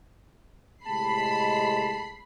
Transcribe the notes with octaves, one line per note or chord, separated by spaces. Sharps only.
A2 C3 G#3 A5 B5 C7